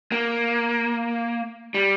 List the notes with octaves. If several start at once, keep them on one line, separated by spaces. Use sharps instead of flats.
A#3
G3